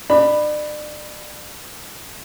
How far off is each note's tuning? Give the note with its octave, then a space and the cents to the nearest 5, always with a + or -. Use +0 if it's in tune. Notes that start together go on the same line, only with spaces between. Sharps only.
D4 +35 B5 +0